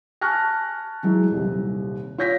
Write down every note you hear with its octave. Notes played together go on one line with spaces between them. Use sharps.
G#5 A5 C#6 F6 F#6 A#6
E3 F#3 G#3
D#1 C2
F4 C#5 G6 A#6 B6